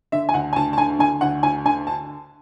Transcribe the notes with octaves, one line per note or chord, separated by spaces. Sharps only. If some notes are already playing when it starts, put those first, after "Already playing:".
D3 E5
G#5
D2 F#5
G#5
D2 A5
A5
D3 G#5
D3 G#5
D2 F#5
D2 G#5
D3 G#5
A5